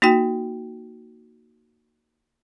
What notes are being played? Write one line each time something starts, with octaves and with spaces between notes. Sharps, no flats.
A#3 D#4 F#4 G5